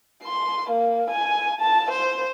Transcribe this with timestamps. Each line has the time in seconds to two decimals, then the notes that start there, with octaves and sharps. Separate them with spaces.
0.23 C6
0.70 A#3
1.10 G#5
1.60 A5
1.91 C5